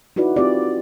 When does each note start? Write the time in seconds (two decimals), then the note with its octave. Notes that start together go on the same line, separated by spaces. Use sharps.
0.16 D#4 E4 F#4 B4 D5
0.36 C4 F4 G4 D5